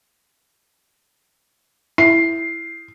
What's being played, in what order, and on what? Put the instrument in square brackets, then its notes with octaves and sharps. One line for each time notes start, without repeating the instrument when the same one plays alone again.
[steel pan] E4 [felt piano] C7